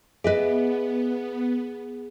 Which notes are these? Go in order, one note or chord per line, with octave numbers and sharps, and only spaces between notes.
B3 G#4 B4 D#5 E5